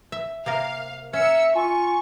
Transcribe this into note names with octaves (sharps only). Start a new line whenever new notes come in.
E5
C3 A#3 A#4 F5
A#3 C#4 E5 E6 C#7
F4 G#5 C#6